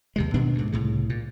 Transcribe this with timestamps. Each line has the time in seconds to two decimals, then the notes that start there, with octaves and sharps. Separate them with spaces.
0.16 D#2 C3 G#3
0.34 B2 D#3 B3 D4
0.55 D2 G#2
0.72 C2 A2 C#3
1.10 A#2